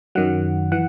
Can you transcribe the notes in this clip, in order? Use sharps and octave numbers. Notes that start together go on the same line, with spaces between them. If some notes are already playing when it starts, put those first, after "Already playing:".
F#2 D#3 F#3 F#5
E3 F#5